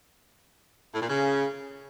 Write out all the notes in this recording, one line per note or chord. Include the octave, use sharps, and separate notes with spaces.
A2
A#2
C#3